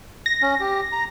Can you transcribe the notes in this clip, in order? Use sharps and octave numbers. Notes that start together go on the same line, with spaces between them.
A#6
C#4
G4
A#5